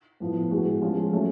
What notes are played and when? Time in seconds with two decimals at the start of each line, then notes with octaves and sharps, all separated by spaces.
0.20 A2 F3 B3
0.51 A2 G#3 B3 F#4
0.82 F3 G#3 C#4 F4
1.12 F#3 A3 C#4